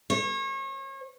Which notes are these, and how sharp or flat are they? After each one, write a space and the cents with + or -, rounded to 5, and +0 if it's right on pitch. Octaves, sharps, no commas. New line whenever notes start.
C#5 -35